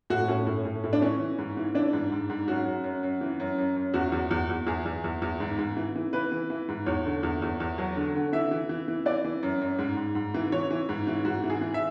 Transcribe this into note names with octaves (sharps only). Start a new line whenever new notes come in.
A2 F#4
A2 C#4
A2
A2
A2
D4
E3 C#4
E3
G#2
E3
E3 D4
G#2
G#2
G#2
F#2 F#4
F#2
F#2
F#2
E3
F#2
F#2
F#2
E2 F#4
E2
E2
E2
E2 G#4
E2
E2
E2
G#2
G#2
E3
E3
E3 B4
E3
E3
G#2
E2 C#5
D3
E2
E2
E2
F#3
D3
D3
E3 E5
E3
E3
E3
E3 D5
E3
F#2
F#2
G#2
G#2
G#2
E3
E3 C#5
E3
G#2
E3
G#2 F#4
E3
G#4
E3
E5